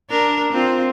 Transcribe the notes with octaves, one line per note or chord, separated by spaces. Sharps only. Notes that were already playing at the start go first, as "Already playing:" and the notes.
D4 A#4
C4 F4